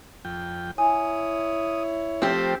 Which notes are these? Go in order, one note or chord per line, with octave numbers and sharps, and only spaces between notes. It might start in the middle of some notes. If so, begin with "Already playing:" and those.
F2 G5
E4 C#5 G#5 D#6
F3 A3 C4 G4 C5